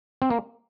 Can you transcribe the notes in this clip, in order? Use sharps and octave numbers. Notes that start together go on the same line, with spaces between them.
C4
A#3